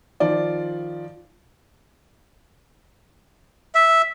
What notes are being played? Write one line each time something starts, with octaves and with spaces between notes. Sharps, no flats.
D#3 F3 F4 D5
E5